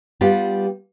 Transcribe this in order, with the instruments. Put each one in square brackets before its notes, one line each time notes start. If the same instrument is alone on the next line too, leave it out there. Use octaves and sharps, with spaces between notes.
[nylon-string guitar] G3 B3 F4 G4